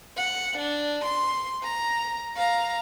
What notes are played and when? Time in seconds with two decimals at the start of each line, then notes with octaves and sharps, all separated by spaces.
0.17 F#5
0.57 D4
1.04 C6
1.63 A#5
2.36 F5 A#5